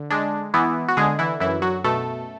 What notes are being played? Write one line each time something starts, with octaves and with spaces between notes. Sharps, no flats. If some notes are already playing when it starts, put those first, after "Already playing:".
Already playing: D3
G#3 D4
E3 B3 E4
F#4
D3 G#3 G#4
E3 E4
F#2 E3 E4
F#3 F#4
B2 A3 A4